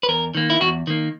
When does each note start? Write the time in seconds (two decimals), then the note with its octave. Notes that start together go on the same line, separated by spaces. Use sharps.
0.03 B4
0.09 E2 A#4
0.35 D#3 A#3
0.50 E4
0.61 E2 F#4
0.87 D#3 A#3